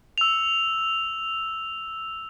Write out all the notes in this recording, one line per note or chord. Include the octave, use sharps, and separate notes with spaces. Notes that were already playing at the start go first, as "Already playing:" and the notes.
E6 F7